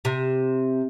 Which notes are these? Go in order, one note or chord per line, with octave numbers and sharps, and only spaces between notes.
C3